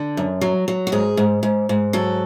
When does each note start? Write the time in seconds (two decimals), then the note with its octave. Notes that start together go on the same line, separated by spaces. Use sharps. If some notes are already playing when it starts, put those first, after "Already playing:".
Already playing: D3
0.17 F#2
0.41 F#3
0.68 F#3
0.87 F#4
0.92 G#2 G#4
1.17 G#2
1.43 G#2
1.69 G#2
1.93 F#3 A4